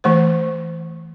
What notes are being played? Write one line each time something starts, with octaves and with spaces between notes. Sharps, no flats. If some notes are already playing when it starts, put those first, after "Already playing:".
E3 A3 C5